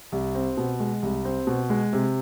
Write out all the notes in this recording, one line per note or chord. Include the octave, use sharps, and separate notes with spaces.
C2
C4
B2
G#3
C2
C4
B2
G#3
C3